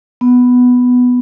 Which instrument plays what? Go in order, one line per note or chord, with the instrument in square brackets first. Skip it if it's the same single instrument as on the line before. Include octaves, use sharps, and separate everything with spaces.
[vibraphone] B3